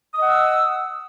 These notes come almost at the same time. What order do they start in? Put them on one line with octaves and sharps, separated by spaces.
D#6 D#5 F#5 E6